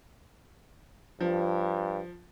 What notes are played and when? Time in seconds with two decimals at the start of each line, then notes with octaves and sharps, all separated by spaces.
1.21 G2 F3